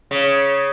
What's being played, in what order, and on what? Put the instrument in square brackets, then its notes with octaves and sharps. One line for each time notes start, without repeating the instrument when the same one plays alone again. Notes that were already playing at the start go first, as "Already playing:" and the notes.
[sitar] C#3